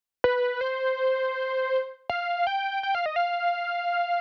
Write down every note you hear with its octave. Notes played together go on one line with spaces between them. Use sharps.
B4
C5
F5
G5
G5
F5
D#5
F5